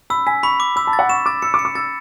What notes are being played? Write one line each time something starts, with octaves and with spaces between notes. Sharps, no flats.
B5 E6
G#5 B6
B5 C#6
D6
B5 E6
A5
A6
F#5
C#6 E7
D6 A6
E6 C#7
D6
C#7
D6
E6 A6